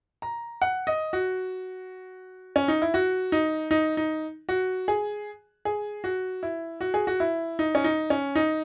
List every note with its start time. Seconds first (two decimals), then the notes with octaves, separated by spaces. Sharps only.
0.22 A#5
0.62 F#5
0.87 D#5
1.13 F#4
2.56 C#4
2.68 D#4
2.82 E4
2.94 F#4
3.32 D#4
3.71 D#4
3.97 D#4
4.49 F#4
4.88 G#4
5.65 G#4
6.04 F#4
6.43 E4
6.81 F#4
6.94 G#4
7.07 F#4
7.20 E4
7.59 D#4
7.75 C#4
7.84 D#4
8.10 C#4
8.35 D#4